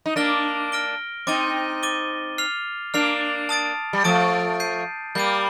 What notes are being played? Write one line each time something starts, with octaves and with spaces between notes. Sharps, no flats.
D#4
A#3 D4 F6 A#6 D7 G7
F6 A#6 D7 G7
C4 D#4 D6 A6 D#7 G7
D6 A6 D#7 G7
F6 C7 F7
A#3 D4 F6 C7 F7
A5 D#6 A6 D7
G3
F3 A3 A5 D#6 A6 D7
G6 C7 D#7
G3 A#3 G6 C7 D#7